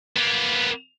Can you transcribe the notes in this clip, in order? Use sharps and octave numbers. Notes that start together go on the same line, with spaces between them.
A#3 B3